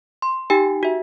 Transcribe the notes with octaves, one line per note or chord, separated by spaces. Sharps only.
C6
D#4 G4 G5 G#5
F#4 E5